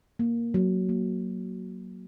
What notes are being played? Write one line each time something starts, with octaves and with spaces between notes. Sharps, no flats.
A#3
F#3
A#3